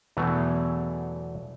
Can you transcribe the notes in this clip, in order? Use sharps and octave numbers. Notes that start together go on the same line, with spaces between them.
E2 B2 E3 F#3 A3